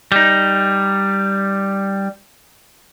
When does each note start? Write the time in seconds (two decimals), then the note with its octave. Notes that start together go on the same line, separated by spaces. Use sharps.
0.12 G3 D#4